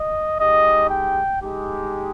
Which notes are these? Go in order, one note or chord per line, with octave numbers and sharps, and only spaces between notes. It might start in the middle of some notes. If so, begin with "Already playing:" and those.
Already playing: D#5
G#3 D#4 G4 D#5
G5
G#3 D#4 G4